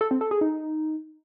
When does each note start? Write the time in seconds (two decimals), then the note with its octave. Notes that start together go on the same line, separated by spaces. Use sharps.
0.01 A4
0.11 C4
0.21 A4
0.31 G#4
0.41 D#4